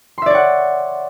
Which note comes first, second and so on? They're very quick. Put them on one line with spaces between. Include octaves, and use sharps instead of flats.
C6 E5 D5 C#5 F#5